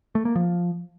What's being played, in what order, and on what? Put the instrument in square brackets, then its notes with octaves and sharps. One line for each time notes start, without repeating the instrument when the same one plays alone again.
[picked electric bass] A3
A#3
F3